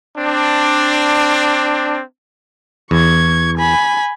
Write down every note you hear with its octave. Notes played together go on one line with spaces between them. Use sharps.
C4 D4
E2 C#6 G#6
G#5 B5